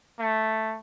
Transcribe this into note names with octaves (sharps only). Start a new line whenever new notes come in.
A3